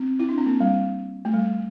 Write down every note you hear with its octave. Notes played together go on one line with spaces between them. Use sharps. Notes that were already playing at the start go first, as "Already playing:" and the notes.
Already playing: C4
E4
D4
C4
A#3
G3
A3
G3